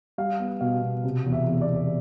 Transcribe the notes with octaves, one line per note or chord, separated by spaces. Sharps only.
G3 F5
B3
B2 F5
B2
C3
E2
E5
E2
D5
E2